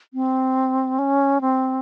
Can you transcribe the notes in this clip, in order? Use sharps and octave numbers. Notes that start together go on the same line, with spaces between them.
C4
C#4
C4